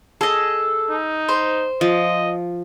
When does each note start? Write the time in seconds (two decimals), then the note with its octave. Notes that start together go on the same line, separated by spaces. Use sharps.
0.21 G#4 A4 D#5
0.90 D#4
1.29 C5
1.81 F3 D#5